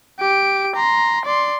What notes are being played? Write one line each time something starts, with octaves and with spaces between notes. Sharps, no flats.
G4 D7
A#5 C6
D5 C6